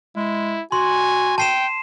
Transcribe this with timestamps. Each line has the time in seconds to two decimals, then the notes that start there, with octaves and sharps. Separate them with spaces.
0.16 G#3 E4
0.72 F#4 G#5 C6
1.38 G5 A5 C7 E7